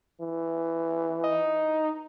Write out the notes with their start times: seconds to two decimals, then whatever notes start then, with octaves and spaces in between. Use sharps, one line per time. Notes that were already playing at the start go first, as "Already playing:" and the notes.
0.21 E3
1.24 D#4